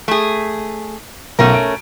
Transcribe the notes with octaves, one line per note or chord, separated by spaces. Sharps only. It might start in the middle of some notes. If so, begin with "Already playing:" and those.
A3 G#4
B1 A3 C#4 A#4
D7